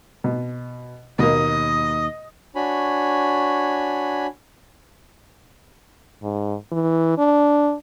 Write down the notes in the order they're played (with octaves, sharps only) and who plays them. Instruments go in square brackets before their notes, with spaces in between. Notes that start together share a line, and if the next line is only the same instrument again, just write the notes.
[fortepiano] B2
[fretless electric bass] D#2 [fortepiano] B2 A#3 [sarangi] D#5
[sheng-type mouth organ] D4 F#4 C#5 G#5 B5
[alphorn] G#2
E3
D4